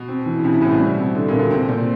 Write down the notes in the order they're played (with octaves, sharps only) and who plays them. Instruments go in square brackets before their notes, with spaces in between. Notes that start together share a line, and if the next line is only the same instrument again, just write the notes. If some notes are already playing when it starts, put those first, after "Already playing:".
Already playing: [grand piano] B2
[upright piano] C4
E3
[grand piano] C#3
[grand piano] C3 [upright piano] E4
[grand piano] C#3
[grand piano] A2 [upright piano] E4
[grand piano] B2
[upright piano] G3
C4
D3
[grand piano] A#2 [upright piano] D3
[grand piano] B2
[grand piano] C3 [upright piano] C4
[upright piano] A#2